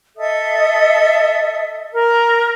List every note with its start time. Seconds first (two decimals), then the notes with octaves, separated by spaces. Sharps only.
0.17 A4 D#5 E5 D#6
1.94 A#4 A#5